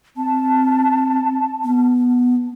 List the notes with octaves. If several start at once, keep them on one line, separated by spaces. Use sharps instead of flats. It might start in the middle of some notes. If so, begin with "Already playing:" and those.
C4 A5
B3